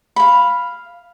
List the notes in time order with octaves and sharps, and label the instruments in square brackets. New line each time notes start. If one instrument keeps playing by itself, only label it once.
[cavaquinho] F5 B5